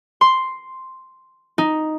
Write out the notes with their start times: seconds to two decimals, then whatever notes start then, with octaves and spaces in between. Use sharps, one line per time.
0.21 C6
1.58 D#4